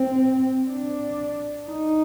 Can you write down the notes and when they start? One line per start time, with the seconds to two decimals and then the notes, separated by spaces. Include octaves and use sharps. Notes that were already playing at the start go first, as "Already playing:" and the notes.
Already playing: C4
0.69 D4
1.69 D#4